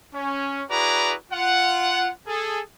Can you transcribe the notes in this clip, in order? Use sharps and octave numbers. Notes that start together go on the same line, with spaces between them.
C#4
E4 F#4 G#4 B4 D5 A#5
F4 F#5
G#4 A4